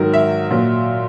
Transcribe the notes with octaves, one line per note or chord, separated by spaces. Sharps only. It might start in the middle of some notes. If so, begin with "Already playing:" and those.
Already playing: G#2 D#3 F#3 A#4
E5
A#2 F#3